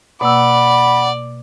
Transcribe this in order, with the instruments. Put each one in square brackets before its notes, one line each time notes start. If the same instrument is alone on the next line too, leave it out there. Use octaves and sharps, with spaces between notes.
[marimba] B2 A#3 E6 [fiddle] D5 [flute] F#5 [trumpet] B5